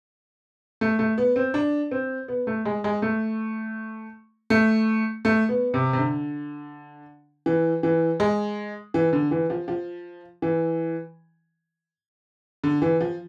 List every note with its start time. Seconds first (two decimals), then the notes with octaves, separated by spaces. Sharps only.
0.81 A3
0.99 A3
1.18 B3
1.36 C4
1.54 D4
1.91 C4
2.28 B3
2.47 A3
2.65 G#3
2.84 G#3
3.02 A3
4.50 A3
5.25 A3
5.49 B3
5.74 C3
5.93 C3
5.98 D3
7.46 E3
7.83 E3
8.20 G#3
8.94 E3
9.13 D3
9.31 E3
9.50 F3
9.68 F3
10.42 E3
12.64 D3
12.82 E3
13.01 F3